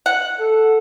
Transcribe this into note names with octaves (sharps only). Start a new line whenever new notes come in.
F#5
A4